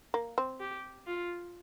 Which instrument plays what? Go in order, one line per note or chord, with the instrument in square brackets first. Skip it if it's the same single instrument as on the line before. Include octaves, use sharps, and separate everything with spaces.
[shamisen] A#3
C4
[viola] G4
F4